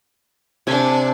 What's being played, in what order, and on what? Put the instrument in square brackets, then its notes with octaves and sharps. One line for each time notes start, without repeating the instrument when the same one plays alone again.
[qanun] C3 G#5 [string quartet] D4